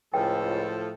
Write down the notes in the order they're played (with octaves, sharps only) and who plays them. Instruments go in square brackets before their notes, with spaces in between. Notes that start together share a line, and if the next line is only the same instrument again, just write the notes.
[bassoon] C#2 [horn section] A2 F3 A4 [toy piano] G5